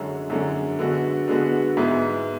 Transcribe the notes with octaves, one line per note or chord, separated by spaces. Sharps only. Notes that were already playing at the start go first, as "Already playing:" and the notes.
Already playing: F#2 D3 G#3 C#4
F#2 D3 G#3 C#4
D3 G#3 B3 F#4
D3 G#3 B3 F#4
G#2 G#3 B3 E4